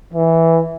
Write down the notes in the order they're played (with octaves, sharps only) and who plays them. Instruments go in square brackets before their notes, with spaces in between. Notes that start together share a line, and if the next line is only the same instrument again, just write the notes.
[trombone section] E3